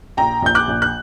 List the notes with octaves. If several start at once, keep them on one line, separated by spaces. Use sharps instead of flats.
A#1 G5 A#5
A#1 G6
D6 F#6
A#1
F#6